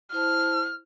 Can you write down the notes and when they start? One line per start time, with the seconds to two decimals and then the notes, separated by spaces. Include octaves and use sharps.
0.13 E4 C5 A5 F6